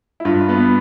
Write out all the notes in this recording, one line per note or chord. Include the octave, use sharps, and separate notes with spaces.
E4
G2 F4
B3